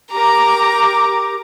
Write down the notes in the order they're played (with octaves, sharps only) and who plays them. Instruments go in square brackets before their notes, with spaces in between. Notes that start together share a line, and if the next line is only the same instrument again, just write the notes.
[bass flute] G4 [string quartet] A#4 D6 [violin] A#5